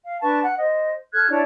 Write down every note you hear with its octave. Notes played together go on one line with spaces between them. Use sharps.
F5
D4 B4 A5 C#6
F#5
C5 D#5
A4 F6 F#6 G#6
D4 E4 C#5 A5